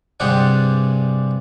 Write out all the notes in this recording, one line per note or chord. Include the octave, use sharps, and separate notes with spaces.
G2 C3 G4 G#4 D5 F#5